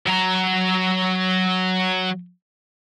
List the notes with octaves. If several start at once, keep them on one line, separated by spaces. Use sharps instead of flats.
F#3 A#5